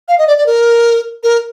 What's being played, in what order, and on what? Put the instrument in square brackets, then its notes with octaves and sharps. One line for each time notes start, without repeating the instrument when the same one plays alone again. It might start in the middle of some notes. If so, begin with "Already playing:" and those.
[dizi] F5
D#5
D5
D5
A#4
A#4